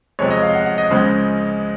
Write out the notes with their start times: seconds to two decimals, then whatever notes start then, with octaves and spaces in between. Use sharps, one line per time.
0.19 F2 C3 F3 G#3 C#5
0.31 D#5
0.43 F5
0.55 F#5
0.66 F#5
0.78 D#5
0.90 C#2 C#3 F3 G#3